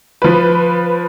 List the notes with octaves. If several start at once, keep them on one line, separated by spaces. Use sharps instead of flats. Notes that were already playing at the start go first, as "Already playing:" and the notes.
F3 B4